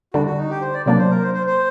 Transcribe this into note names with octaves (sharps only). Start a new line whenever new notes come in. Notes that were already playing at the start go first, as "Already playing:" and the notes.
D3 G3 D4 F#4
F#4
D#4
G4
C5
D5
C3 F#3 A#3 D4 D5
C5
A#4
C5
C5
C5